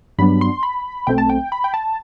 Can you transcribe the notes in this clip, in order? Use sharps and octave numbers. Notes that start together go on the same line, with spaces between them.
G2 F#3 B3 D4 B5
C6
B5
B1 B2 A3 C4 G5
A5
G5
B5
G5
A5